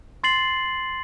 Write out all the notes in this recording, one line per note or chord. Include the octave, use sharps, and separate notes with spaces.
C6 A6 C7 F#7